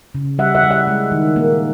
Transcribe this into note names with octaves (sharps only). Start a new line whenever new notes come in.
C#3
G3 E5 F#5
E5 F#5
G3
E5 F#5
G#3
D#3
A#3